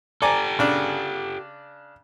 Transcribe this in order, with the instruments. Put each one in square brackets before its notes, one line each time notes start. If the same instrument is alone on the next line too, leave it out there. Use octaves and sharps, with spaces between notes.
[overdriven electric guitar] G4 A4 [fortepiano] D5 G#5 A#5
[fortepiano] C#3 D4